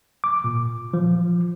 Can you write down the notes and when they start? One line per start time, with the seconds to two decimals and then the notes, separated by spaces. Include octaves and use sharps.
0.24 D6
0.44 A#2
0.94 F3